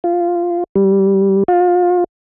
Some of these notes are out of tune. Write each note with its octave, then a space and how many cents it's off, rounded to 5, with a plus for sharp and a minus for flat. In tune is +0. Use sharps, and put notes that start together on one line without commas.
F4 -5
G3 -10
F4 +30